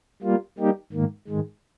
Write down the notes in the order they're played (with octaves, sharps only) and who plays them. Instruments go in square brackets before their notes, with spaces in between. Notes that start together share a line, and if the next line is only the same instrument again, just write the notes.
[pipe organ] G3 A#3 F4
G3 A#3 D#4 G4
G#2 D#3 A#3
G#2 D#3 G#3